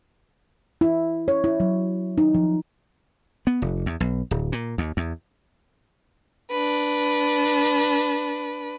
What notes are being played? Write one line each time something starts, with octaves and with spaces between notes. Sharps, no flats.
E4
C#5
E4
F#3
D#4
F3
B3
F1
E2
B1
D1
A#2
D#2
E2
D4 B4